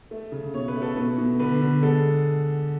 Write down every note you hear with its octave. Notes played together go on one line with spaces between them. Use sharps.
A3
C#3
B2 C#5
B4
A3
A4
B2 B4
B2
D3 B4
D3
G#3 A4